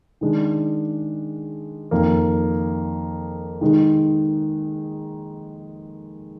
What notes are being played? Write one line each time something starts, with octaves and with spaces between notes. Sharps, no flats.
D#3 G#3 D4
F2 D#3 A#3
D#3 G#3 D#4